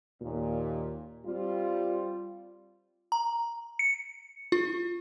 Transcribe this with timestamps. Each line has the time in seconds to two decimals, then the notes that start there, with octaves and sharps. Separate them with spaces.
0.22 D#2 A#2
1.26 G3 C4 F4
3.12 A#5
3.79 C#7
4.52 F4